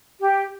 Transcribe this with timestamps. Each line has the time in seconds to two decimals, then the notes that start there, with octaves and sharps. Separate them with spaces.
0.20 G4